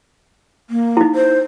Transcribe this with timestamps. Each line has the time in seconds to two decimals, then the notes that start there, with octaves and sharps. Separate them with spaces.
0.70 A#3
0.97 D#4 E4
1.15 C5